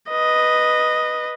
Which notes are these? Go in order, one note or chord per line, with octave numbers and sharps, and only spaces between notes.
B4 D#5